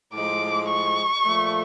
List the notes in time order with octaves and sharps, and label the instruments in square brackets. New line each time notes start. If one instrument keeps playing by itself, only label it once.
[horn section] A2 F3 G#3 [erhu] D6
[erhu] C#6
[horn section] A#2 F3 A3